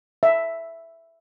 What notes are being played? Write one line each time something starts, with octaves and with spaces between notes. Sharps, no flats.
E5